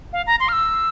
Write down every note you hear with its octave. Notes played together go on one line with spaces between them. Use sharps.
F5
A#5
C6
F6
E6